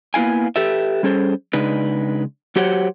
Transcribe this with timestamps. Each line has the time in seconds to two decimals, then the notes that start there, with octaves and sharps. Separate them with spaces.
0.14 A#3 B3 E4 F5 G#5
0.56 G4 A4 B4 E5
1.03 G3 C#4 G#4 A4 C5
1.53 C#3 G#3 D4 D#4 B4
2.56 F#3 F#4 G4 C5 C#5 F#5